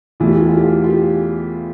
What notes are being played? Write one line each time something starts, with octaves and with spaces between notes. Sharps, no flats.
E2 E3 A3 F4
G4
F4
G4
F4
G4
F4
F4
G4